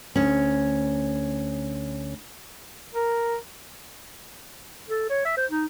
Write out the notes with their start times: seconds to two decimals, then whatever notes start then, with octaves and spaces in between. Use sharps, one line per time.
0.16 D2 C#4
2.94 A#4
4.89 A4
5.09 C#5
5.25 E5
5.37 C5
5.51 D#4